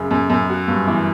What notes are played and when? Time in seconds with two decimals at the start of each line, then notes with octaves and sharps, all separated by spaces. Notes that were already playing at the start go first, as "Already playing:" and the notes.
Already playing: F#2 C#3
0.11 F#2
0.30 F#2
0.50 F#4
0.68 G2
0.87 E3